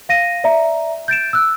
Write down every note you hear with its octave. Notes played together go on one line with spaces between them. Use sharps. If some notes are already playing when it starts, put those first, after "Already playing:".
F5 A#6 D#7
D5 E5 A#5
G6 A6 D7 E7
E6 F#6